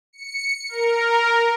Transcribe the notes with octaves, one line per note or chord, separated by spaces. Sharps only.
C#7
A#4